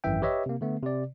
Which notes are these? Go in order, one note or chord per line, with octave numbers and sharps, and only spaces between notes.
G#1 F#2 E3 E5 G5
G4 B4 C#5 D#5 E5
C3 A#3
D3 A3 B3
C3 D5